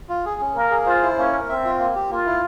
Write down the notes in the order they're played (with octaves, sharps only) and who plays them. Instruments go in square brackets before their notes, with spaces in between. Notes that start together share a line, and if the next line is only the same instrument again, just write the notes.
[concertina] F4
G#4
C#4
[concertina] A#3 [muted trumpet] A#4
[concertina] G#4
[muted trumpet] F4 [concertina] C5
[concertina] E4
[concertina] A#3 [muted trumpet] C#4
[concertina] A#4
[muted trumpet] C4 [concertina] E5
[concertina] F4
A#3
G4
[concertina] A#3 [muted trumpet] F4
[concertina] E4